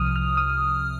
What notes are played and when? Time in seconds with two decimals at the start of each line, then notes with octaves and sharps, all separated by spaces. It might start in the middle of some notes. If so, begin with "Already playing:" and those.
Already playing: C2 C3 F3 D#6 F6
0.16 F6
0.37 D#6